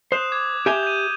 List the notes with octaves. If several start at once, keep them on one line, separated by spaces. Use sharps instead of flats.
C5 D#6 F#6 E7
D6 G#6
G4 E5 G#5 G6 F7 G7
G6 D#7